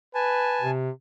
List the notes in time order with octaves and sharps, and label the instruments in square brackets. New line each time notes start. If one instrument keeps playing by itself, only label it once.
[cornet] B4 [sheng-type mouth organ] G#5 A5
[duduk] C3